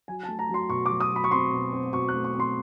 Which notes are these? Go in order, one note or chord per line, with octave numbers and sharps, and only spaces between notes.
F#3 G#5
A5
A3
A#5
F#3
C6
B2 C#6
D6
F#3
D#6
F#3
B5
C#6
C4 C6
B2
C4
B2 C#6
F#6
A3
C#6
C4
C6